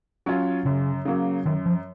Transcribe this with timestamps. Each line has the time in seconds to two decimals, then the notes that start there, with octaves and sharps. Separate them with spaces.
0.26 F#3 C#4 F4
0.65 F#2 C#3
1.05 C#3 F#3 A#3
1.46 F#2 D#3
1.66 F3